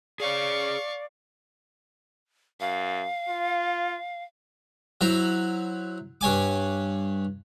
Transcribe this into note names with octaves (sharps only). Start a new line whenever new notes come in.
G#4 C#5 D5 F5 C#6
F#2 F5
F4
F#3 E4 C5 A#5
G2 C#5 G#5 D6